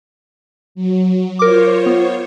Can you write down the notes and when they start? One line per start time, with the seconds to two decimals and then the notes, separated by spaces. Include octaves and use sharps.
0.75 F#3
1.39 F4 A#4 C5 C#5 D6
1.86 B3